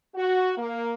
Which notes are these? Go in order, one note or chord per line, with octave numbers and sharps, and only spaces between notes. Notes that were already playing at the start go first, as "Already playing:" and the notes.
F#4
A#3